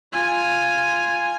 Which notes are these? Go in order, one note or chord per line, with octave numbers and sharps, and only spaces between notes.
F4 G#5